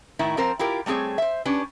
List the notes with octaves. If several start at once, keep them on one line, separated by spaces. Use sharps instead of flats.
A2 D#3 E4
F3 C4 A#4 C5
E4 F4 G4 A#4
G3 A3 C4 G#4 C#5
C5 E5
C#4 D4 G4 B4